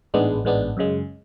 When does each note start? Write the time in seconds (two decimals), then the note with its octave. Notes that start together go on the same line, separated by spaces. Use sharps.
0.14 A1 G#2 G#3 B3 D4
0.45 A1 G#2 G#3 B3 D4
0.77 F#2 C#3 G#3